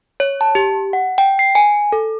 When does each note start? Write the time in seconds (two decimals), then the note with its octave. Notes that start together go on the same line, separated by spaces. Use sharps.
0.20 C#5
0.41 A5
0.55 G4
0.93 F#5
1.18 G5
1.39 C7
1.55 G#5
1.92 A4